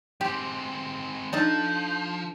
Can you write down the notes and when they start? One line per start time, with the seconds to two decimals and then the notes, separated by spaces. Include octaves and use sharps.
0.21 G#3 C4 G4
1.33 F3 D4 D#4 A4 G6